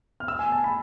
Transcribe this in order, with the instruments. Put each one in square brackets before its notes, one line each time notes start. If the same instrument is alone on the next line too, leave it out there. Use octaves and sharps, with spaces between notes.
[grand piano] F6
E6
G#5
A5
B5